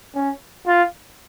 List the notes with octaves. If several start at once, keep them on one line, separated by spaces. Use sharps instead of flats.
C#4
F4